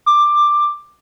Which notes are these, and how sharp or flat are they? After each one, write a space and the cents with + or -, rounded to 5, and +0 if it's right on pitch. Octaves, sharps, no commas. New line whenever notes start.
D6 +10